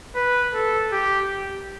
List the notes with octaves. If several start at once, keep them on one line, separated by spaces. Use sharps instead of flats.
B4
A4
G4